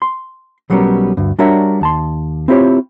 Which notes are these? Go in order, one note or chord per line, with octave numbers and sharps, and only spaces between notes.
C6
B1 F#3 G3 B3 C#4 A#4
D2 G2
G3 D4 F#4 A#4 C#5 E5
D#2 A5 C6
C4 E4 F4 G4 B4 C#5